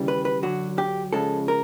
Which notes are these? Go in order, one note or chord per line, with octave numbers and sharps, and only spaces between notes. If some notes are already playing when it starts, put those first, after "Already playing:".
Already playing: D#2 C#3 E3 G3
B4
B4
F#2 D3 F#3 F#4
G4
C#2 C#3 F3 G#3 A4
A#4